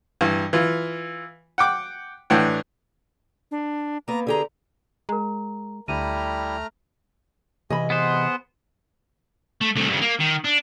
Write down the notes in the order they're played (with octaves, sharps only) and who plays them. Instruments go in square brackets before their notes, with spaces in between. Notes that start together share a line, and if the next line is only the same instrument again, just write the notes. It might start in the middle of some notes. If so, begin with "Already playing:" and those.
[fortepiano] G2 E3
E3 F4
F#5 G5 D6
A2 E3 D4 F#5 G5
[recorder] D4
[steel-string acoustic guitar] A#3 B3 [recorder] A#5
[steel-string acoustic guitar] D3 G4 A#5 [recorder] G#4
[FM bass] G#3 [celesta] A#4 A#5
[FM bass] D2 [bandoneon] G3 E4 G4 [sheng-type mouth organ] A3 A#5 F6 [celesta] D#7
[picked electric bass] C3 E3 [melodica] C#4 G#5 [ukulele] D#5 B5
[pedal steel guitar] B3 C5 [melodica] G#4 F#5 C6
[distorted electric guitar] A3
C2 A3
G2 C#3
A#3
D#3
D4